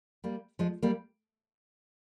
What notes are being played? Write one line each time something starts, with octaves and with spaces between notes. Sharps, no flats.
G3 A#3
F3 G#3
G3 A#3